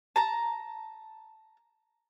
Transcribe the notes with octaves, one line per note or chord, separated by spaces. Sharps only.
A5 A#5